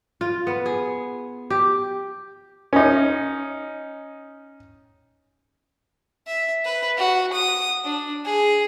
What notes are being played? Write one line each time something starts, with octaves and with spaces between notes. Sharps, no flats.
F4
B3
G#4
G4
C#4 D#4
E5
B4
F#4
D#6
D4
G#4